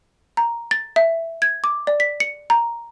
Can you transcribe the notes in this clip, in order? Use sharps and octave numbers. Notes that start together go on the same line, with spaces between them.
A#5
A6
E5
G#6
D6
D5
B6
C#7
A#5